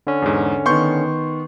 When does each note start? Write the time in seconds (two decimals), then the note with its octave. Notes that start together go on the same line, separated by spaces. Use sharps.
0.07 D3 C#4
0.22 E2 G#2
0.66 D#3 B3 C6 C#6 G6